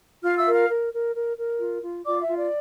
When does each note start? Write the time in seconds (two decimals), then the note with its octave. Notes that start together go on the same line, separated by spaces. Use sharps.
0.23 F4 F5 F6
0.39 E5 E6
0.46 A#4
0.53 F5 F6
0.69 A#4
0.92 A#4
1.14 A#4
1.37 A#4
1.59 F4
1.82 F4
2.05 F4 D5 D6
2.21 E5
2.27 F4
2.36 D5